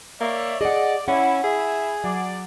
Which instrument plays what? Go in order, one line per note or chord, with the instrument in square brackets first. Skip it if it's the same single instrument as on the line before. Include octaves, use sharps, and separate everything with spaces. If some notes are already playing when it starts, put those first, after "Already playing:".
[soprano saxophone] A#3 [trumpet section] C#5 D5 E5
[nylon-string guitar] G#4 F#5 [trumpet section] D5 [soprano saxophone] D#5
[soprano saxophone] C#4 [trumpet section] E4 [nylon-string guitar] F#5
[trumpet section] E4 E5 [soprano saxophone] G#4
[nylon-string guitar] F#3 [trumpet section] D5